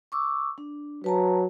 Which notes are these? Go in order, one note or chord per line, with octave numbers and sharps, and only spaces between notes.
C#6 D6 E6
D4
F#3 B4 A5 A#5